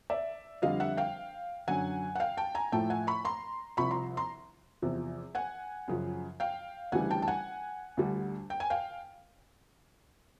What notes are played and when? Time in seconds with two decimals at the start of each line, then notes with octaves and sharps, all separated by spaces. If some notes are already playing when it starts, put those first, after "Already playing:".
0.10 D5 E5
0.62 F2 D3 G3 D#5 F5
0.80 E5 F#5
0.97 F5 G5
1.68 F#2 D3 F#3 F#5 G#5
2.15 F#5
2.20 F5 G5
2.37 G5 A5
2.55 G#5 A#5
2.72 A2 F3 A3 G5 A5
2.90 F#5 G#5
3.07 B5 C#6
3.25 A#5 C6
3.77 C2 C3 F3 B5 C#6
3.91 A#5 C6
4.17 A#5 C6
4.82 E2 C3 F3
5.35 F#5 G#5
5.88 F#2 C#3 F3
6.40 F5 G5
6.92 D2 C#3 E3 G3 F#5 G#5
7.10 G5 A5
7.22 A5
7.28 F#5 G#5
7.97 D2 D3 G3
8.50 G5
8.60 G#5
8.70 F5 G5